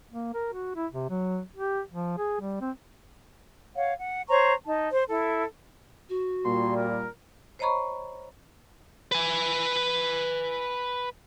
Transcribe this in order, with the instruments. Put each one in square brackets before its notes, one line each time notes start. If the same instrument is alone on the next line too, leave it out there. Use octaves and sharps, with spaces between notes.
[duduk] A#3
A#4
F#4
E4
C3
F#3
G4
F3
G#4
G3
C4
[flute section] C#5 F5 F#5
F#5
C5 C#5 A#5 C#6
D#4 A5
C5
E4 A4
[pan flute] F#4
[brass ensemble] A#2 G3 [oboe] C6
[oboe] A#4
[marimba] C5 C#5 D#5 A#5 B5 C#6
[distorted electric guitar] B4 G#5